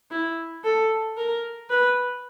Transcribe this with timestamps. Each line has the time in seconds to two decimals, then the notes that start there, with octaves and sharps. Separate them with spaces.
0.11 E4
0.64 A4
1.17 A#4
1.69 B4